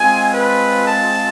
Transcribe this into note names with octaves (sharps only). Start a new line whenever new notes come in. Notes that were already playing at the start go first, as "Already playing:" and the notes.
Already playing: G#3 C4 F4 G#5
B4
A5